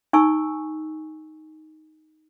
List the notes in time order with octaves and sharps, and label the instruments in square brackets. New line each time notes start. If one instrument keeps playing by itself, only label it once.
[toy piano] D#4 G#5 C#6 E6